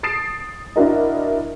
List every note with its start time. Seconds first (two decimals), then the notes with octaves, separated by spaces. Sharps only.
0.03 D#6 A6 C7 D7 E7
0.76 D4 E4 F#4 A#4 D#5